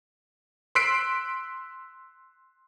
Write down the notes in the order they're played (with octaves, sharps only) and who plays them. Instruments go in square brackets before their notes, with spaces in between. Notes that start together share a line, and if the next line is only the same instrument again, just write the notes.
[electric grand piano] C6 E6 F#6 B6 C7 D7